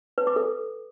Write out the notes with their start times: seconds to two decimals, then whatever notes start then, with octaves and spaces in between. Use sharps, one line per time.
0.18 B4
0.27 D6
0.36 A4